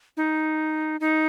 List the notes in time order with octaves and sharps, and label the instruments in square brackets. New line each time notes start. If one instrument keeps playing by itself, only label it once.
[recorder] D#4
D#4